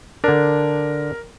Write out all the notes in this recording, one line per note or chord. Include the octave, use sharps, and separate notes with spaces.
D3 D4 A#4